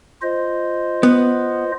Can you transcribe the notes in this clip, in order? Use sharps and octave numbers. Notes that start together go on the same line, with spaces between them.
F4 C5 D#5
B3